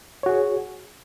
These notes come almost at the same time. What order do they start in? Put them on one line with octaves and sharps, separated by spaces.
C#5 F#4 G#4